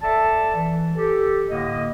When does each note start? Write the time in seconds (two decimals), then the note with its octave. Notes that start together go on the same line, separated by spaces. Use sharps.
0.02 A4 D5 E5 A5
0.55 E3
0.96 G4 A4
1.49 A2 D3 A#3 D#5